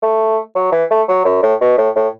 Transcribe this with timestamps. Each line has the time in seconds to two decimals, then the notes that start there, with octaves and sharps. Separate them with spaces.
0.02 A3
0.55 F#3
0.72 E3
0.90 A3
1.08 F#3
1.25 F#2
1.42 A2
1.61 B2
1.78 A2
1.96 A2